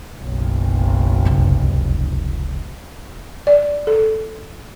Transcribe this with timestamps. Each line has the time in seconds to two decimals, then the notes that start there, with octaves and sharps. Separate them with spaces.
0.19 F#1 B1
1.25 F1 C#2
3.47 D5
3.87 A4